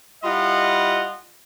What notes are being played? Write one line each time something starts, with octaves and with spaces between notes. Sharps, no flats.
G3 E4 F4 D#5 F#5